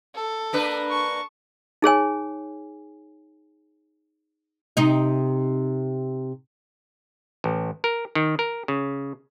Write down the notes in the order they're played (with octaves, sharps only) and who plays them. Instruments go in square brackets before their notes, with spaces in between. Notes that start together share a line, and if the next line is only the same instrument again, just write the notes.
[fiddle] A4
[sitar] A#3 D4 B4
[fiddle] A5 C#6
[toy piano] D#4 G#4 C#5 G#5
[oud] C3 D#4
[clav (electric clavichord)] A1
A#4
D#3
A#4
C#3